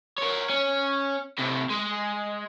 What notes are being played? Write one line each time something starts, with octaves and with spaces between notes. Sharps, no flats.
A#4 C#5
C#4
A2 C3
G#3